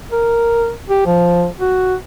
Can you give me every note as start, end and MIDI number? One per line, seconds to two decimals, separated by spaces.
0.11 0.71 70
0.89 1.04 67
1.06 1.47 53
1.60 1.95 66